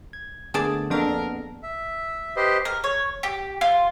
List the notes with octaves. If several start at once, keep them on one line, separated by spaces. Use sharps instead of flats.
G#6
D3 A3 B3 G#4 D5 A5
F2 A#3 B3 D4 A4 A#4
E5
G4 B4 C5 D#5
A#4
C#5
G4
F4